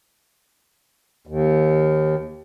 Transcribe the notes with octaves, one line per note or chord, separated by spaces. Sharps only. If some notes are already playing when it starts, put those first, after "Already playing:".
D#2